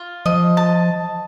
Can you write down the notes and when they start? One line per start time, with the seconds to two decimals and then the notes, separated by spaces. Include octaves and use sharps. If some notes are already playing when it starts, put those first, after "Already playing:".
Already playing: F4
0.26 F3 D#5
0.57 A5